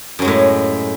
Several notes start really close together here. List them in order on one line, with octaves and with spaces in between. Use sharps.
F#2 F#3 G#3 A2